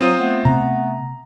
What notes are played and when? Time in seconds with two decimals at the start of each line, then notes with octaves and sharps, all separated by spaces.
0.01 F#3 C4 F4 C5 D#6
0.19 A3 B3
0.45 C3 C4 A#5